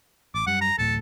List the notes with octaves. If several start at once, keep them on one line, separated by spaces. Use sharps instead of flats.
A1 D6
F#2 G3 F#5
A#5
A1 D2 A2 A4